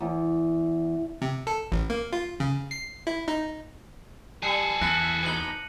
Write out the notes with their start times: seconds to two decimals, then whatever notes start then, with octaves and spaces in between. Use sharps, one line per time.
0.01 E2
1.22 C3
1.47 A4
1.72 A1
1.90 A#3
2.13 F4
2.40 C#3
2.71 C7
3.07 E4
3.28 D#4
4.43 G3 G#4 A4 A5 C#7
4.81 E2 E4 F#6 A#6 C#7
5.23 A#2 A3 D#4 D#7 F#7